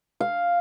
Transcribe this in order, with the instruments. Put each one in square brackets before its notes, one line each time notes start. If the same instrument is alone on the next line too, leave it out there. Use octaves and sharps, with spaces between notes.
[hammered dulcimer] F5